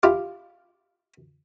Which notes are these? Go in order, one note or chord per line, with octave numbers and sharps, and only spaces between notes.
E4 F4 G4 F5